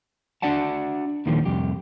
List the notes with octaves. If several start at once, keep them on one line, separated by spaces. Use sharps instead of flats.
D4 F#4 D5 F#5 A5
D#2 A#2 D3 D#3 F3 G3
C2 F2 G4